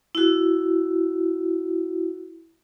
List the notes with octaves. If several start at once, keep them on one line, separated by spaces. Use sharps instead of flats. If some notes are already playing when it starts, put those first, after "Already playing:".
E4 F#4